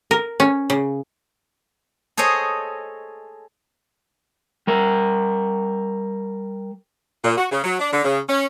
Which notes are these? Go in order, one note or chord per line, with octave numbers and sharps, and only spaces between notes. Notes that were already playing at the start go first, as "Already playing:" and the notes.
A#4
C#4
C#3
G#4 A4 C5 C#5 D#5
G3 A#4
A#2
F#4
C#3
F#3
D4
D3
C#3
C#4